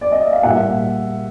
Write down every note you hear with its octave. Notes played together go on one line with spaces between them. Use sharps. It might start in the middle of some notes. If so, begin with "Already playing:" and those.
D5
D#5
E5
F5
A#2 G3 A#3 E5 F#5